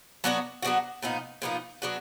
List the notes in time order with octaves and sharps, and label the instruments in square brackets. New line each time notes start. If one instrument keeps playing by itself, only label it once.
[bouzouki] F#3 B3 D4 F#4
F#3 B3 D4 F#4
A#2 F3 B3 D#4
A#2 F3 B3 D#4
F#3 B3 D4 F#4